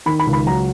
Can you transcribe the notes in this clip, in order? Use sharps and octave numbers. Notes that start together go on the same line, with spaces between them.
D#3 B5
B5
C#2
B5
F#3 A#5